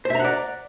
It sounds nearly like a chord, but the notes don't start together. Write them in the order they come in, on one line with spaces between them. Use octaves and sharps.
C5 E5 A#5 F#5 D5